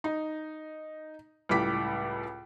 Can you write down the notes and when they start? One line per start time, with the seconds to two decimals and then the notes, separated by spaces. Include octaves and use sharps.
0.04 D#4
1.49 C#2 A2 G3 D6 B6